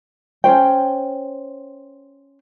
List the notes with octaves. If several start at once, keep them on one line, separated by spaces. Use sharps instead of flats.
C#4 D4 C5 G5